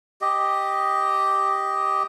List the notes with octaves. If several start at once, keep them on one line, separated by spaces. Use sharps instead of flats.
G4 D#5